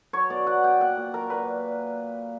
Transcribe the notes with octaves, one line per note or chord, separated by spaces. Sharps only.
F#3 C#5
B2 D5
F#3 F#5
B2 G5
A#2 F#5
A#2
F#3 A#4
A#2 B4